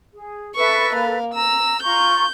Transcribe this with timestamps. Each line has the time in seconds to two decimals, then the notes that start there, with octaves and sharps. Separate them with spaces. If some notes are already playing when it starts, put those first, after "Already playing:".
0.13 G#4
0.56 A4 B4 E5 C#6
0.94 A#3 F5
1.34 A#5 E6
1.83 F4 A#5 C#6 G6